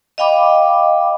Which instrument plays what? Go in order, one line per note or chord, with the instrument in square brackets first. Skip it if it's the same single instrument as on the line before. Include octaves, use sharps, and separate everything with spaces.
[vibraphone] D#5 F5 G5 B5 D6